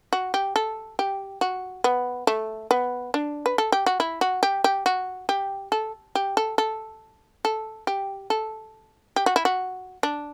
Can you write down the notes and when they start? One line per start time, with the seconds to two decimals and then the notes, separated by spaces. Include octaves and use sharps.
0.13 F#4
0.34 G4
0.56 A4
0.99 G4
1.41 F#4
1.84 B3
2.27 A3
2.71 B3
3.14 D4
3.46 B4
3.58 A4
3.72 G4
3.86 F#4
4.00 E4
4.21 F#4
4.43 G4
4.64 G4
4.86 F#4
5.29 G4
5.72 A4
6.15 G4
6.37 A4
6.58 A4
7.45 A4
7.87 G4
8.30 A4
9.16 G4
9.26 F#4
9.36 E4
9.45 F#4
10.03 D4